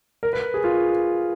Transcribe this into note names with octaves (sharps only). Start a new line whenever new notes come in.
A#4
B4
G#4
F4